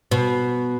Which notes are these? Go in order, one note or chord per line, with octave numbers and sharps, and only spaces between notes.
B2